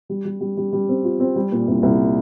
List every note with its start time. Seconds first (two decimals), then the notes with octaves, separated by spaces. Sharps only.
0.09 G3
0.25 G3
0.41 G3
0.57 G3
0.73 G3
0.89 C4
1.04 F4
1.20 C4
1.36 G3
1.52 A#2
1.68 C2
1.83 C2